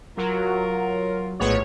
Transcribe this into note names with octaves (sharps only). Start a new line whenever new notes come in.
F#3 F4 A#4
A#1 A2 G#3 B3 C#5